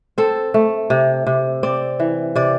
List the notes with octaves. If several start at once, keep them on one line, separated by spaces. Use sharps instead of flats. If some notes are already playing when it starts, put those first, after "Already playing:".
C4 A4
A3
C3
C3
C4 D5
E3
C3 D5